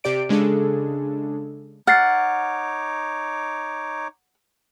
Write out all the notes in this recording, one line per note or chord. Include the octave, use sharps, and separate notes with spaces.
C3 G4 D5 D7
C#3 G#3 D4 G#4 A4
D#4 C#5 F#5 D6 F6 A6 C7